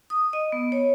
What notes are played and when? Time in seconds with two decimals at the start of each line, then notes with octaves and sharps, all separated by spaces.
0.10 D#6
0.33 D#5
0.52 B3
0.72 C#5